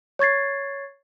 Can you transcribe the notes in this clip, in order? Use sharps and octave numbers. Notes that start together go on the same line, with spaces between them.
C#5 C#6 G#6 A6 C7